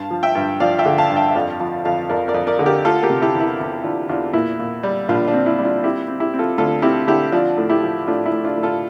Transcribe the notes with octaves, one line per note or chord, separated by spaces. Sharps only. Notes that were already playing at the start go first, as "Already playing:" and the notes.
Already playing: G2 F5 A5
F3
E5 G5
G2
F3 D5 F5
E5 G5
D3
F5 A5
G2
E5 G5
E5
F2 D5 F5
F3 F5 A5
F2 F5 A5
F2 A#4 D5
A#4 D5
F2
A#4 D5
D3
G4 A#4
A3 F4 A4
G4 A#4
C3
E4 G4
E2
E4
E2 E4
E2 D4 F4
E2 D4 F4
A#2 E4
A#2
G3
A#1 D4 F4
D4
C4
E4
G3
D4 F4
C4 E4 G4
C4
E4 G4
C4
F4 A4
D2 F4 A4
C4 E4 G4
D3 E4 G4
F3 D4 F4
A2
E4 G4
F3
A2 D4 F4
E4
A2
D4 F4
A2
F4 A4